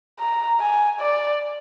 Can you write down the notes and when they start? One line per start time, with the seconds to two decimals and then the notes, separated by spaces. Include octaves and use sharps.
0.20 A#5
0.60 G#5
1.01 D5